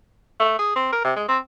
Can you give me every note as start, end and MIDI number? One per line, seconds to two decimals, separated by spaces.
0.40 0.56 57
0.59 0.73 68
0.76 0.90 60
0.92 1.00 70
1.04 1.13 48
1.16 1.25 56
1.29 1.39 60